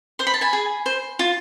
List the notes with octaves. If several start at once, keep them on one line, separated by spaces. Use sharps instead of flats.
C5 C6
B5
A5
G#5 B5
G#4
C5
F4